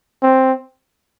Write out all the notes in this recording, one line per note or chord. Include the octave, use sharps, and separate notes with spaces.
C4